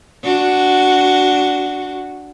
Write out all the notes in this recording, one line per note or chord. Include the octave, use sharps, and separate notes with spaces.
D4 F#4